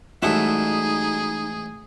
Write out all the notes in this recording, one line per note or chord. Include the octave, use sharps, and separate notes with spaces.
A1 G#2 G3 D#4 F#4 G#4 A4 E5